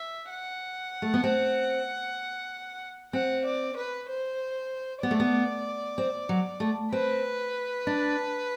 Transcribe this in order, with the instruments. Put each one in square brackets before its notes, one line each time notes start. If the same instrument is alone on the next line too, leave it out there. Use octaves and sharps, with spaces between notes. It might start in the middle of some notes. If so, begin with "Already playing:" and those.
Already playing: [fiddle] E5
F#5
[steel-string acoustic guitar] A3
B3
C4
[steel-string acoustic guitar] C4 [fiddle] F#5
[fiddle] D5
B4
C5
[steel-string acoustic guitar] B3 [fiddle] D5
[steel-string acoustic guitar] A3
B3
C4
F#3
A3
[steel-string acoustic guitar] C4 [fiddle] B4
[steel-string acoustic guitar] D4